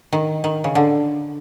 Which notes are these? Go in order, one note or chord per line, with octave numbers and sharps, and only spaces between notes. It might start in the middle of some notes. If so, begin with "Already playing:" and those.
D#3
D#3
C#3
D3